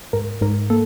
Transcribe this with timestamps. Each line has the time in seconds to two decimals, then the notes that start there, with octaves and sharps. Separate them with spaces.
0.13 G#2 A#4
0.41 G#2 A#4
0.70 A#3 A4